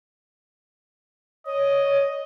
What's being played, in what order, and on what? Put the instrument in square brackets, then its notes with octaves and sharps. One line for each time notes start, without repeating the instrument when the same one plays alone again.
[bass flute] C#5 [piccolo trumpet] D#5